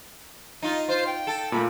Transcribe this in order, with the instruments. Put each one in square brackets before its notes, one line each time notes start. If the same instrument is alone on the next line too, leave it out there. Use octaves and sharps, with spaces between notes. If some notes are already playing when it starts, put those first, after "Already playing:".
[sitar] D#4 F4
[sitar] F4 [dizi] C5
[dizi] G5
[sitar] A4
[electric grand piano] A#2 A3 A#3 [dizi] B5